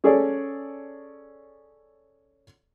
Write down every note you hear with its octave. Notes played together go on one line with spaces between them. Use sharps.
C#4 G#4 A4 C#5 D5